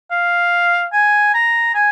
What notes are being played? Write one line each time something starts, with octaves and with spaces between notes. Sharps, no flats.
F5
G#5
A#5
G#5